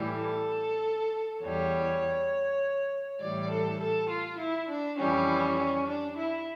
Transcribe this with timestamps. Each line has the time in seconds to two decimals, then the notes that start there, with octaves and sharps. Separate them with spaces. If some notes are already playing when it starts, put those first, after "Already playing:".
Already playing: A2 E3 G3
0.09 A4
1.42 E2 E3 G3 C#5
3.20 A2 E3 G3 D5
3.49 A4
3.79 A4
4.09 F4
4.38 E4
4.68 D4
4.98 F2 E3 G3 C#4
5.87 D4
6.16 E4